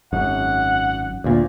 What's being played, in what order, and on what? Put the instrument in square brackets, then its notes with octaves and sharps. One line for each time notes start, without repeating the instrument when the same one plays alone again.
[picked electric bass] G#1 F#2 [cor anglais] F#5
[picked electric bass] D2 A#2